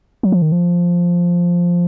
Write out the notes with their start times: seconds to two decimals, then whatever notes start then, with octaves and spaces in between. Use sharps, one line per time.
0.23 F#3
0.32 F3
0.42 D#3
0.52 F3